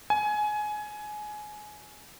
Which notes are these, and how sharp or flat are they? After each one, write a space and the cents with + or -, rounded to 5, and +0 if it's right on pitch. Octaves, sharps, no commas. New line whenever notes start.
G#5 +20